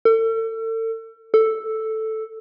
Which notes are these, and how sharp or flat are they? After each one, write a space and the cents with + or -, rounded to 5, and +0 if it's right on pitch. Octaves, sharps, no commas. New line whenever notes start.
A4 +35
A4 +0